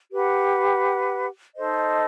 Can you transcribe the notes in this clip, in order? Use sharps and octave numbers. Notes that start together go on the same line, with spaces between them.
G4 B4 F#5
D#4 A4 C5 D#5